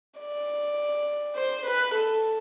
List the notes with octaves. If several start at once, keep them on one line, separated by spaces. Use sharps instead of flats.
D5
C5
B4
A4